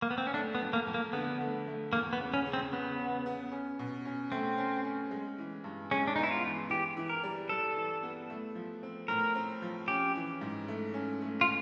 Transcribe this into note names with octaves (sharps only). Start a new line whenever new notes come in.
A#3
B3
C4
C#4
A3 D4
B3
F2
A#3
F2
A#3
D3 B3
A3
A3
E2 A#3
B3
C#3
C#4
C#3
C4
C#3 B3
C#3
B3
C#4
B2
C#4
A3 C4
C#4
C#4
G#3
E3
G2
G#3 C#4
D4
B3 D#4
E4
F4
E3
E3 G4
E3
A#4
G3
G3 A4
E3
B3
A3
F3
C4
A2 A#4
C4
F3
C#4 G4
E3
G#2
A3
C#4
A3
F4